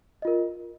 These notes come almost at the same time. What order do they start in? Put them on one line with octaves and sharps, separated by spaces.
D#5 F4 A#4